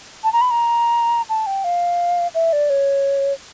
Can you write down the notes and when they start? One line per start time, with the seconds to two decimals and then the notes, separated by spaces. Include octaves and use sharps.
0.24 A5
0.33 A#5
0.41 B5
0.51 A#5
1.29 A5
1.46 G5
1.64 F5
2.35 E5
2.53 D5
2.70 C#5